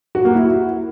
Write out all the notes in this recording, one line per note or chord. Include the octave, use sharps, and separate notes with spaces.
F#4
A#3
E4
F#4